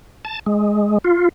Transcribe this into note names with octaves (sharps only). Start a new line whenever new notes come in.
A5
G#3
F4